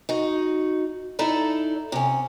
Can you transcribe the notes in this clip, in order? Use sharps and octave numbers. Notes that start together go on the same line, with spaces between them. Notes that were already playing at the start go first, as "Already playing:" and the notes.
D#4 F#4
D#4 E4 A4 D5
C3 C#4